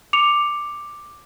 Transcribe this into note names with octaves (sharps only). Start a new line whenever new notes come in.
D6 C#7 F7